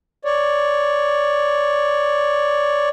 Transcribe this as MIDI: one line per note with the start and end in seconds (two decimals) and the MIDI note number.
0.25 2.89 73
0.25 2.89 74